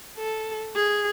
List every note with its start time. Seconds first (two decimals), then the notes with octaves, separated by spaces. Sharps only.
0.18 A4
0.76 G#4